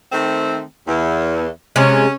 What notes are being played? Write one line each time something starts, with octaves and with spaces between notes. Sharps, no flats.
D#3 A3 C4
E2
C3 G#3 C#4